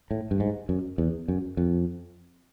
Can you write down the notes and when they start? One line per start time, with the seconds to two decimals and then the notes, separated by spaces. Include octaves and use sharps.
0.11 A2
0.31 G2
0.40 G#2
0.69 F#2
0.98 E2
1.28 F#2
1.57 F2